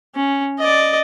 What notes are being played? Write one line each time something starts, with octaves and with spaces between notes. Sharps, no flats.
C#4
D5 D#5